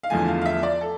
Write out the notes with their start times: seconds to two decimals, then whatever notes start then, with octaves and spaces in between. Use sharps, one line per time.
0.03 F5
0.10 E2 D3 F3 A3 G#5
0.28 F5
0.41 F5
0.45 E5
0.63 D5
0.81 A4